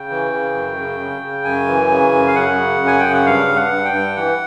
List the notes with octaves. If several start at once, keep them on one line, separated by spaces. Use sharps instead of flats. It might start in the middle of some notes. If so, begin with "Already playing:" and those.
Already playing: C#3 G5
E3
C#3
F#2
C#3
C#3
C#3
F#2 G#5
E3
C#3
F#2
F5
F#2 F#5
C#3
F#2
G#5
C#3 G5
F#5
G2 F5
G2
F#5
G2
G5
G2
E3 F#5